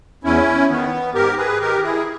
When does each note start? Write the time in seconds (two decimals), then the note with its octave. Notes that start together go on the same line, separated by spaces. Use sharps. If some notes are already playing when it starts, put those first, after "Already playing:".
0.24 E2 C#4 E4
0.69 D#3 B3
1.14 G#2 G4 A#4
1.37 G#4 B4
1.60 D#3 G4 A#4
1.83 E4 G#4